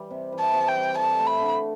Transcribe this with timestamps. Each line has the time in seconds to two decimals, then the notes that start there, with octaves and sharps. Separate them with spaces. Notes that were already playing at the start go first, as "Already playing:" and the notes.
Already playing: E3 G3
0.10 C3
0.32 E3
0.40 A5
0.54 C3
0.68 G5
0.76 G3
0.98 A4 A5
1.20 A3
1.27 B5
1.41 D3